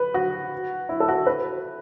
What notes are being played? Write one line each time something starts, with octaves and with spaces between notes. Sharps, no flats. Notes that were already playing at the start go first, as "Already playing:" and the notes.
Already playing: B4
F#4
E4
A4
F#4
B4